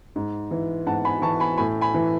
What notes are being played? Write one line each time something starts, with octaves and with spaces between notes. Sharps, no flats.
G#2
E3
G#2 F#5 A5
G#5 B5
E3 A5 C#6
G#5 B5
A2 G#5 B5
G#5 B5
E3